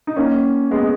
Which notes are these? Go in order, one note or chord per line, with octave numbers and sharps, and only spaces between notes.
D#4
A#3 C#4
G#3 B3